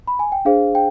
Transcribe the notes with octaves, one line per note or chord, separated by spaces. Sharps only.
B5
G#5
G5
D4 G#4 C5 F5
G5